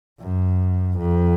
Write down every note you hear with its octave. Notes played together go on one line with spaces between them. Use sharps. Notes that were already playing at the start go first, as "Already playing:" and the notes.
F#2
F2